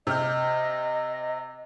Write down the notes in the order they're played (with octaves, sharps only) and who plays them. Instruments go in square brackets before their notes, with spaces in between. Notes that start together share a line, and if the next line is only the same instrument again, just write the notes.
[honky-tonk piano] C3 F6 G6 [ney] D#5